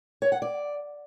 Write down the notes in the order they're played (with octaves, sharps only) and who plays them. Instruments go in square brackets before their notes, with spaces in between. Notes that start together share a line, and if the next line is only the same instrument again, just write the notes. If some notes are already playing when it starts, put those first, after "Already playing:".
[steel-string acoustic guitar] C#5
F#5
D5